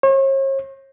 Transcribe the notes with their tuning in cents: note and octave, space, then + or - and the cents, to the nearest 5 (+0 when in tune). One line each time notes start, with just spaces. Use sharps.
C#5 -45